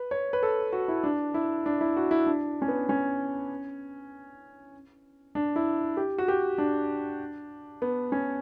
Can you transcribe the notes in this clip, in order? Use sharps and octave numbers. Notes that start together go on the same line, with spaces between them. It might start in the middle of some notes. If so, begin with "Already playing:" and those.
Already playing: B4
C#5
B4
A4
F#4
E4
D4
E4
D4
E4
F#4
E4
D4
C#4
B3
C#4
D4
E4
G4
F#4
G4
D4
B3
C#4